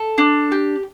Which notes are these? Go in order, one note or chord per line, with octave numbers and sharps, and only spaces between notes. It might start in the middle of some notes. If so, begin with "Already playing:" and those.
Already playing: A4
D4
G4